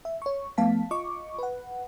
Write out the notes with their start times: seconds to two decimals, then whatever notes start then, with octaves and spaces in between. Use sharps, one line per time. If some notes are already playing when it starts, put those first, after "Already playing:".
0.05 E5
0.22 C#5 C#6
0.58 F3 A3 B3 F5 A5 B6
0.91 F4 D#5 C#6 D6
1.39 B4 F#5